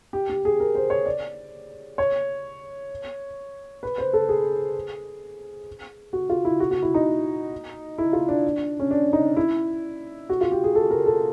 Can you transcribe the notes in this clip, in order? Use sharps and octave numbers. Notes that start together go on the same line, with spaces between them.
G4
G4
G#4
A#4
C5
C#5
D5
C#5
B4
C5
A4
G#4
F#4
F4
E4
F#4
F#4
E4
D#4
E4
F4
D4
C#4
D4
D#4
E4
F#4
F4
G4
G#4
A4
A#4
A4